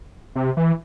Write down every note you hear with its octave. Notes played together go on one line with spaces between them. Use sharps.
C3
E3